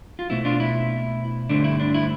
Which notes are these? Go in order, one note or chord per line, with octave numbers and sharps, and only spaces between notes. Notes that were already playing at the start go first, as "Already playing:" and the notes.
F4
B2 A3 C4 E4
D4 F4
E4
G2 D3 A3 C4 D4
E4
D4
E4